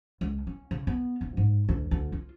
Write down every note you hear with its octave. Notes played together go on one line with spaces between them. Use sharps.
C#2
C#4
C#3
B3
D#1
G#2
D2
D2
F4